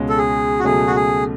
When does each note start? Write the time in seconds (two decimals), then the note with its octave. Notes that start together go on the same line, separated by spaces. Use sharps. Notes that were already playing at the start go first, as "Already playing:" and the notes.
Already playing: C#2 B2 G#3 C#4
0.09 A4
0.18 G#4
0.60 F#4
0.64 C#2 B2 F#3 A3 G#4
0.87 F#4
0.96 G#4